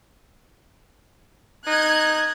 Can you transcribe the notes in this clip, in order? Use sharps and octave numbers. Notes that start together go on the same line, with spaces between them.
D#4 F#6 G#6